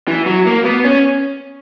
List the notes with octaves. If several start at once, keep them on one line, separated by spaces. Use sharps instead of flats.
E3
F#3
A#3
B3
C#4